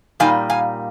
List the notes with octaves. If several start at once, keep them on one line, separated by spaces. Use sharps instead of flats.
A#2 G3 A#3 D#4 F5 G#5
F5 G#5